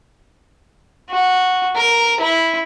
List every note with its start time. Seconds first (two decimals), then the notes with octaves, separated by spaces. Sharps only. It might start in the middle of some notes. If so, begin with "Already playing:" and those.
1.10 F#4
1.76 A#4
2.21 E4